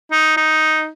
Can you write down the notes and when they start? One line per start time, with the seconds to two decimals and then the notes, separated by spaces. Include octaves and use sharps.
0.12 D#4
0.37 D#4